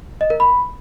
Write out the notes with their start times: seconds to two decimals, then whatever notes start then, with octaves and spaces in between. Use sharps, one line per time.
0.21 D#5
0.30 A#4
0.40 B5